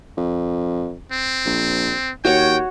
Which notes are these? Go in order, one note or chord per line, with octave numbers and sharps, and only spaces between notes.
F2
C4
A#1
D#2 F#4 C#5 G5